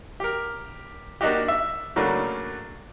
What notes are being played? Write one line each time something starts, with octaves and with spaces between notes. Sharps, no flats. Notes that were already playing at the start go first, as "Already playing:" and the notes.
G4 A#4
A#3 D4 D#4 F#4 G4
E5
C#3 F#3 A3 A#3 D4